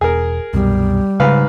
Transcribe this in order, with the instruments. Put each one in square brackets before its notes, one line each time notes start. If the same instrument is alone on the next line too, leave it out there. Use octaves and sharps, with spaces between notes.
[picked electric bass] E1 [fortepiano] G#4 A#4
[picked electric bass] C2 F#2 B2 [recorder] G3
[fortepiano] G#2 B4 F5 [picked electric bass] C#3